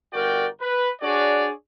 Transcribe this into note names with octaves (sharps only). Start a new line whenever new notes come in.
G1 F#4 A#4 D5 G5
B4
D4 F#4 G#4 C#5 D5